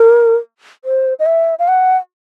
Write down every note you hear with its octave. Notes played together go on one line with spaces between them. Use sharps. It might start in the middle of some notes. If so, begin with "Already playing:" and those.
Already playing: A#4
C5
D#5
E5
F5
F#5